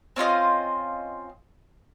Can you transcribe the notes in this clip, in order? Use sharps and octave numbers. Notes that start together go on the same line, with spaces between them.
C4 C#4 F4 D#5